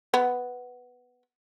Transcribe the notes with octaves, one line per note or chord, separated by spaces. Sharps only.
B3